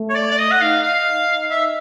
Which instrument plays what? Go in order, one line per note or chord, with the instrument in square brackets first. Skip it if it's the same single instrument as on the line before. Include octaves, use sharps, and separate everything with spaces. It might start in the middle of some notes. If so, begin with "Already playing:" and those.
Already playing: [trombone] A3
[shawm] C#5
D5
D5
D#5
F#5
[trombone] D#4 [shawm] F5
[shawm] F5
E5